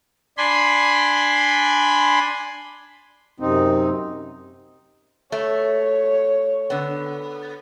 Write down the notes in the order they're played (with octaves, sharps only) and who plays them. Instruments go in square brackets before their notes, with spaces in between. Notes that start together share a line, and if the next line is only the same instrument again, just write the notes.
[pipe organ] D4 G#5 B5 C6
[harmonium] F#2 C3 C4 D#4
[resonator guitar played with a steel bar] A3 [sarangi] C#5
[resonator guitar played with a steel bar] D3 B3